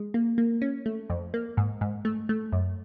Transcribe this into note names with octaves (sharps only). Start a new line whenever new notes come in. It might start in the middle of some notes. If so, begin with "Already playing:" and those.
Already playing: G#3
A#3
A#3
C#4
A3
F2
A#3
G#2
G#2
A3
A3
F#2